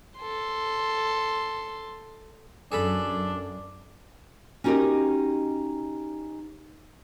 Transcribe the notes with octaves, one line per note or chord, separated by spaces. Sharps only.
A4 C6
F#2 D4 G#4 A4 B5
C#4 D#4 F#4 G4 A#4 D#5